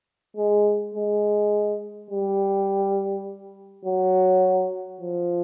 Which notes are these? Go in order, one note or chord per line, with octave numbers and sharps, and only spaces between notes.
G#3
G#3
G3
F#3
F3